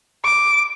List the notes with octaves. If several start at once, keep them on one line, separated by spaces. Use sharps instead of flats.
D6